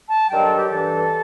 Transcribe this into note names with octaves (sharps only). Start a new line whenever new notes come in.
A5
G2 D#3 F#3 G5
A4
G4
G2 E3 A4